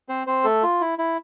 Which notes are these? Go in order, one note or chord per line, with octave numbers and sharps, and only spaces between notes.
C4 C5
C4 C5
A3 A4
F4
E4
E4